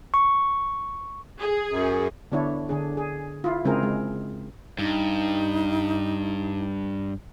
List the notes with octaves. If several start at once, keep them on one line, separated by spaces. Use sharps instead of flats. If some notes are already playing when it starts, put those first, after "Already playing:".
C#6
G#4
F#2
D3 B3 D4 E4 C#5
D3 D4 G#4
G#4
E4 F4
C#3 G#3 C4 E4 G#4 A#4
G#3
G2 D#4